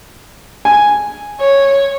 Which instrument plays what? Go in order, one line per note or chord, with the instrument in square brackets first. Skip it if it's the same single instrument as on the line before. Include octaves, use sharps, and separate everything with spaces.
[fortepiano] G#5
[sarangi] C#5